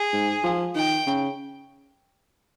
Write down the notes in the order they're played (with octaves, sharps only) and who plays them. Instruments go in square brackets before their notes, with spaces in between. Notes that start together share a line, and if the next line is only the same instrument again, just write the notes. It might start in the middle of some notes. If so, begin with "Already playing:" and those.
Already playing: [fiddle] G#4
[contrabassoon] G#2
F3
[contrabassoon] D#3 [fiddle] G5
[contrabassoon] C#3